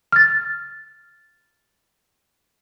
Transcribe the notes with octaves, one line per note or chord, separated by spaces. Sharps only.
F6 A6